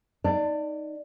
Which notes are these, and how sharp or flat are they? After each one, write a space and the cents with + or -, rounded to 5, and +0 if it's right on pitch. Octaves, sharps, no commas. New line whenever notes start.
D#4 +0 D5 +0 A5 +35